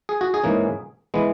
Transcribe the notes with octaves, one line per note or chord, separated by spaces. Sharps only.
G#4
F#4
G#4
G#2 E3 A#3 C#4
E3 G#3 B3